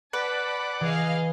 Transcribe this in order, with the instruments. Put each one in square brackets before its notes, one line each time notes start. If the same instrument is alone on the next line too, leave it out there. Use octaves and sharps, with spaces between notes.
[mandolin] B4 [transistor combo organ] D5 F#5 [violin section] A5 B6
[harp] E3 [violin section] G#4 D#5 F5